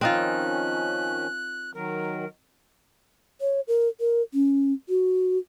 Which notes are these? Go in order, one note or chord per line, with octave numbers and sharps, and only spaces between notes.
D#3 F3 C4 C#4 D#4 F4 F#6
D#3 F#3 A#4
C#5
A#4
A#4
C#4
F#4